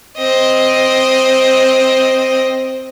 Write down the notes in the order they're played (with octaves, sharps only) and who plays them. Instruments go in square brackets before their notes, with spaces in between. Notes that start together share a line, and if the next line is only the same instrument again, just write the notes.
[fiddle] C4 D#5